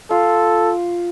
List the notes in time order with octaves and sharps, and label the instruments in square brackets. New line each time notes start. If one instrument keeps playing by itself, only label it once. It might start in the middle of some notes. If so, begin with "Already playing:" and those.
[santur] F4 [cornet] A4